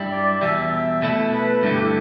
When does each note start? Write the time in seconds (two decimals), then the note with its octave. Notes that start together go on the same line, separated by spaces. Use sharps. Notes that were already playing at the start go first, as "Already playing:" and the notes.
Already playing: G2 G3 E4
0.11 D5
0.41 E2 B2 G3 E5
0.56 E5
0.72 E5
1.02 B2 A3 E4
1.33 B4
1.63 G2 D3 A3
1.74 G4
1.83 E4